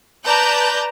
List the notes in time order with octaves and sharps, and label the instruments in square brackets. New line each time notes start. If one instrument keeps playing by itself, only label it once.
[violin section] B4 D5 A5 A#5 G6